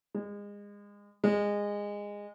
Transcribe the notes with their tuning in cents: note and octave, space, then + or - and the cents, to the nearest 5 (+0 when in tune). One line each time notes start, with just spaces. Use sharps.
G#3 -30
G#3 -20